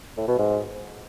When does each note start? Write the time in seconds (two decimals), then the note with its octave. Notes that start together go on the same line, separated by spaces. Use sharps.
0.17 A2
0.28 B2
0.38 G#2